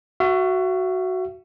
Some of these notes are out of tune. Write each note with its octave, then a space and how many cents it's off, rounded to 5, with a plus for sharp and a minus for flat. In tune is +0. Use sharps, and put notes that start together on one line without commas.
F#4 +5 E5 +40